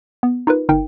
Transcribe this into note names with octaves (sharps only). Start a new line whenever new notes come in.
B3
D#4 F4 A#4 B4
G1 D#4 A#4 G5